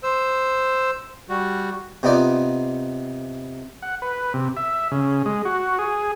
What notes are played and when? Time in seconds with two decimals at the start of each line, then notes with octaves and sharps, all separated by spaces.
0.03 C5 E6
1.30 G3 F#4
2.03 C3 B3 D#4 F4 D5
3.82 F#5
4.02 B4
4.34 C3
4.57 E5
4.91 C#3
5.26 G#3
5.45 F#4
5.78 G#4